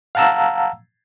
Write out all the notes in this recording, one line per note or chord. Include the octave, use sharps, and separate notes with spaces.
F5 F#5 A5 A#5 E6